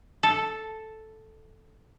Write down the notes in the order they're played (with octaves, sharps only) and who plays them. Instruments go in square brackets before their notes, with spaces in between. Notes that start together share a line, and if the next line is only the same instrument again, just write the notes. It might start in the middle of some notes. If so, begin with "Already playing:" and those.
[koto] A4